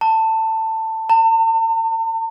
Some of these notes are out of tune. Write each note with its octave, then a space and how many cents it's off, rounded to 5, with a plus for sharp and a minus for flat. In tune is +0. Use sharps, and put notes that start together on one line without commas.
A5 +20
A5 +45